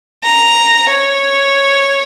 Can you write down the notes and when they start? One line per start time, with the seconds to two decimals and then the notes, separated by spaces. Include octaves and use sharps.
0.24 A#5
0.90 C#5